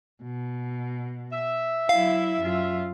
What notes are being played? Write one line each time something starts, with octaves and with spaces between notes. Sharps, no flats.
B2
E5
F#3 E4 F5
F#2 F4